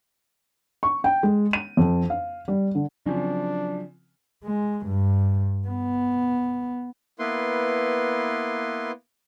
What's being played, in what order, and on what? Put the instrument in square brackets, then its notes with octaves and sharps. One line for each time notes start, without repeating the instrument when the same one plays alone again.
[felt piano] C#6
G5
G#3
D#7
F2
F5
G3
D3
[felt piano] C#3 F3 C4 [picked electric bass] F#3 [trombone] D4
[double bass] G#3
G2
B3
[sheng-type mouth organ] A#3 B3 E4 B4 C6